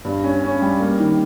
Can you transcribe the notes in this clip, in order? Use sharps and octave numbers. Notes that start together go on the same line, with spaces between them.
G2
C#4
C#4
G3
A#3
D#3